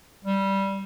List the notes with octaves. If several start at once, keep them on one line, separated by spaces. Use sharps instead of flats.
G3